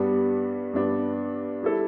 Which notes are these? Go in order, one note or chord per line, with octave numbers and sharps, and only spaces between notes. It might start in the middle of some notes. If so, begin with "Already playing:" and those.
Already playing: G2 G3 B3 D4
G2 G3 B3 D4
G3 E4 A4